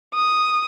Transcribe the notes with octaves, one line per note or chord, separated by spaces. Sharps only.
D#6